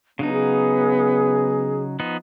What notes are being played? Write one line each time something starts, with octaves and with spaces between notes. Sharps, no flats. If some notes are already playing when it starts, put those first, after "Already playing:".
C#3 F#3 B3 D4 D#4
G#4
F3 B3 D#4